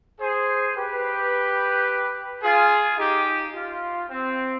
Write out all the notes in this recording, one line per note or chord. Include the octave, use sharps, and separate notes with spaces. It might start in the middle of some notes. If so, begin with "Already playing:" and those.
G#4 C5
G4 B4
F4 G#4
D#4 G4
F4
C4